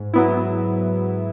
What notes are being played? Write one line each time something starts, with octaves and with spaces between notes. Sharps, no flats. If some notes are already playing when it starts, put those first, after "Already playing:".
Already playing: G#2
F#3 B3 E4